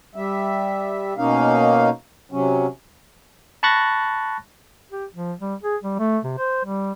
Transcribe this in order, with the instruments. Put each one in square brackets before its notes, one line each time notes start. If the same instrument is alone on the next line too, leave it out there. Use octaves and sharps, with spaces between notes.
[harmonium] G3 E5
B2 A#3 C#4 D#4 F5
C3 F#3 C#4
[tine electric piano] A5 B5 C#6 F#6 A6 A#6
[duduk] G4
F3
G3
G#4
G3
A3
C3
C5
G3